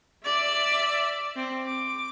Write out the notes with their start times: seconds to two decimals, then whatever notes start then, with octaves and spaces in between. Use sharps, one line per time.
0.25 D5 E5
1.36 C4
1.66 D6